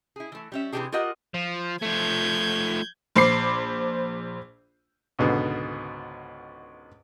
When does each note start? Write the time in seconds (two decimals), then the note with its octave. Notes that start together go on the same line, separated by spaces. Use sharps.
0.16 E4 G#4
0.32 E3 A3
0.52 G3 C#4 E5
0.72 C3 E3 F#3 D4 G4 G#4
0.92 F4 G4 A#4 D#5 F#5
1.34 F3
1.82 F3 A3 G6 G#6
3.16 A#1 C5 B5 D6 C7
5.19 C#2 G#2 B2 D3